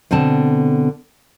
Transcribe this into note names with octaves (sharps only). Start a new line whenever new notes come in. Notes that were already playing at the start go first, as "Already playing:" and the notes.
B2 D3 C4 A5